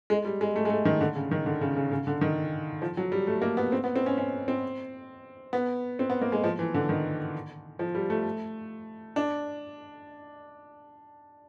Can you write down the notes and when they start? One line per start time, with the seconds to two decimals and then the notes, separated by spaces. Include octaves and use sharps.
0.10 G#3
0.25 G3
0.41 G#3
0.56 A3
0.65 G#3
0.70 A3
0.85 D#3
1.01 D3
1.15 C#3
1.31 D#3
1.46 D3
1.61 C#3
1.76 C#3
1.91 C#3
2.07 D3
2.21 D#3
2.82 F3
2.97 F#3
3.12 G3
3.27 A3
3.42 A#3
3.57 B3
3.72 C4
3.84 B3
3.96 C4
4.06 C#4
4.18 C#4
4.48 C4
5.53 B3
5.99 C4
6.10 B3
6.21 A#3
6.32 G#3
6.44 F3
6.59 E3
6.74 D3
6.89 D#3
7.79 F3
7.95 G3
8.10 A3
9.16 D4